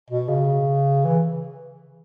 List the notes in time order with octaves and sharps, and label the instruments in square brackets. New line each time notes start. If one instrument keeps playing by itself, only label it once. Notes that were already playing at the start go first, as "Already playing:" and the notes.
[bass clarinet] B2
C#3
E3